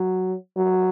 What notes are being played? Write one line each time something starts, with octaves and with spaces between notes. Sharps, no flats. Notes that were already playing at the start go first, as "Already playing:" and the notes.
Already playing: F#3
F#3